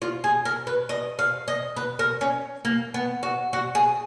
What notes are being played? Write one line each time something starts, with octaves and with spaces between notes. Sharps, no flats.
F4
G#4
A#4
B4
D#5
F5
D#5
B4
A#4
C#4
A#3
B3
F#4
F#4
G#4